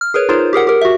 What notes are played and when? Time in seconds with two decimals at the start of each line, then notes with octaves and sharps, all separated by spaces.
0.01 F6
0.14 G#4 A#4 B4 C#5
0.29 D#4 F4 G#4 A#4 C5 C#5
0.53 G4 G#4 A#4 F#5
0.67 G4 A#4
0.81 F#4 E5